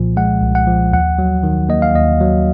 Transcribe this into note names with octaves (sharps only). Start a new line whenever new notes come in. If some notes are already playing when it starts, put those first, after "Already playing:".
Already playing: C2 A#2 F3
G#3 F#5
C2
F#5
F3
D#2 F#5
F#3
D#3
A#3 D#5
F5
D#2 D#5
F#3